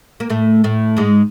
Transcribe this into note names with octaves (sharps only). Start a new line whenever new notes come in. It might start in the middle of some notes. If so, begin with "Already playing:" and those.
A#3
A2 A3
A2 A3
G#2 G#3